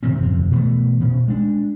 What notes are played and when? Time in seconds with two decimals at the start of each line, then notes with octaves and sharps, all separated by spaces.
0.03 C3 D#3 C4 C#4
0.22 D1 F2 C3
0.52 B2 E3 A3
1.00 B2 C#4
1.28 G#3 D4